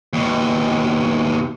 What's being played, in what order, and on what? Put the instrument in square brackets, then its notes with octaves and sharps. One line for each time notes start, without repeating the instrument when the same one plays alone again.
[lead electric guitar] D#2 B2